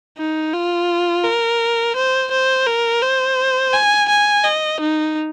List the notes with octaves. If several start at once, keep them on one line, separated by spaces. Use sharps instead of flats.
D#4
F4
A#4
C5
C5
A#4
C5
G#5
G#5
D#5
D#4